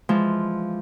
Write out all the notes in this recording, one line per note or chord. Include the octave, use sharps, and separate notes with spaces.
E3 F3 G#3